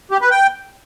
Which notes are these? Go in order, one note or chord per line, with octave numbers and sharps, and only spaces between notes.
G4
B4
G5